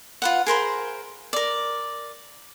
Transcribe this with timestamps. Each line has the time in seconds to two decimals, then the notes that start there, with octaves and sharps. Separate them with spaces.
0.22 F4 B4 F#5
0.46 G#4 A#4 C5 B5
1.33 A#4 D5